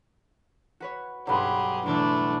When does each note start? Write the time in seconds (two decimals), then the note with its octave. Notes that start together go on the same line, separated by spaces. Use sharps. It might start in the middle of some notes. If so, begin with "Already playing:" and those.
0.80 F#4 B4 C#5
1.27 B1 G2 F#3 G4 G#4 B4 C6
1.86 E2 B2 A3 D4 E4